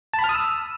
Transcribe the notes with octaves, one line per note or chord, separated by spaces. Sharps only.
A5
B5
F6
D#6
E6